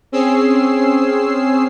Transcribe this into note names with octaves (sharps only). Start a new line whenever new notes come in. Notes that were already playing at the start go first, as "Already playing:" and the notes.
C4 C#4 G#4 E6 C7